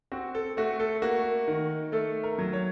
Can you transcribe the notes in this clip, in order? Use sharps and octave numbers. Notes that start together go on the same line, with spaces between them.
C4 F#4
A4
A3 F#4
A4
A#3 F#4
D#3
A3 A4
A#4
F#3
C#5